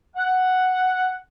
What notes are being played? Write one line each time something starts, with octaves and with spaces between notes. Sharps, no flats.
F#5